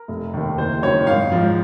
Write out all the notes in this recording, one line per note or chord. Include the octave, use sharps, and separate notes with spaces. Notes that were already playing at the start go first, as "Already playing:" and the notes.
Already playing: A#4
F1
D#2 D#3
F#1 C5
F#2 D#3 C#5
G#1 F5
G#2 F3